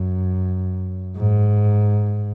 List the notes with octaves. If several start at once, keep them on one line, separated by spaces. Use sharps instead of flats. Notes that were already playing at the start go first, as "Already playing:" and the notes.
Already playing: F#2
G#2